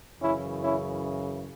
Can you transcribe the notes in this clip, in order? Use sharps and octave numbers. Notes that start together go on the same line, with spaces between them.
F#2 C#3 E3 C#4 E4
C#4 E4